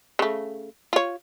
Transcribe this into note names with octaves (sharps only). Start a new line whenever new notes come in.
C#3 A3
F4 C#5